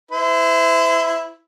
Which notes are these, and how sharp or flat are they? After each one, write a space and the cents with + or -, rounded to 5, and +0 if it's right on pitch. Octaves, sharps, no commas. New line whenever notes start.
E4 +0 C5 -40